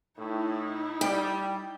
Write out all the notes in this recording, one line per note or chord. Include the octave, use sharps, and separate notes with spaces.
A2 D#4 E4
G3 G5